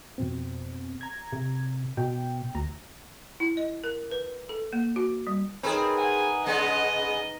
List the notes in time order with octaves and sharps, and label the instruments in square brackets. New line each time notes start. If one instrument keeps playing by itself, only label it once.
[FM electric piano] F2 B2 C4
A#5 G#6
[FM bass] C3
[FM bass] B2 [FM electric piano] G5
[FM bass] D2 [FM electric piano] A#5
[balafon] E4
D#5
A#4
B4
A4
A#3
F#4
G3
[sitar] C4 G#4 [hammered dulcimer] D#4 A#4 B4
[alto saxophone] F#5 [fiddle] G#5
[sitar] C#3 G#3 B3 [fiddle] D#5